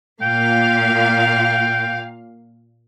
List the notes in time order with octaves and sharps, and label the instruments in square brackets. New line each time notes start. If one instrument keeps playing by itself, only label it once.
[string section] A#2 F5 [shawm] G5